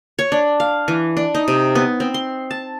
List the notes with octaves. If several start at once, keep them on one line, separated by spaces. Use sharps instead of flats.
C#5
D4
F5
E3
D4
D#4
C3
B3
C4
C6
A5